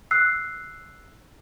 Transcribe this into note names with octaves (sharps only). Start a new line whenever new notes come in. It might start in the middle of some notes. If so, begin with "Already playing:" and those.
E6 F#6 C7